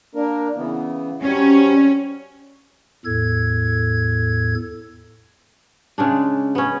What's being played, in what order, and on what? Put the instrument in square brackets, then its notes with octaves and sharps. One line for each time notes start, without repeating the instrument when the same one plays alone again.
[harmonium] A#3 D4 A#4
C#3 E3 B3
[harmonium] F#3 G3 C4 [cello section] C#4
[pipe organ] E2 A2 A4 G#6
[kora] C#3 G#3 D4
B3 C#4